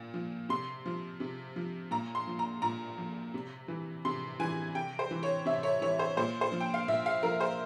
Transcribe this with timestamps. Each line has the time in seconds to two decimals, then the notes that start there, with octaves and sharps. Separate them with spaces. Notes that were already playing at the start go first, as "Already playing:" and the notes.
Already playing: A#2
0.14 F3
0.49 C3 C6
0.86 F3
1.20 C3
1.56 F3
1.91 A#2 A#5
2.15 C6
2.27 F3
2.39 A#5
2.62 A#2 A#5
2.98 F3
3.34 C3
3.68 E3
4.05 C3 C6
4.39 E3 G#5
4.75 C3 G5
4.99 C5
5.11 E3
5.23 C#5
5.46 C3 E5
5.63 C#5
5.82 E3 C#5
5.99 C5
6.17 A#2 C5
6.41 C5
6.52 F3
6.60 G5
6.74 F5
6.88 A#2 E5
7.06 F5
7.23 F3 A#4
7.40 C5